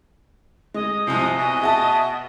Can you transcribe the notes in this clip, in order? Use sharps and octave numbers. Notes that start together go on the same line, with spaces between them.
G#3 D#5
C2 C3 F3 G#5
B2 D#5
G#4 E5 F#5 A5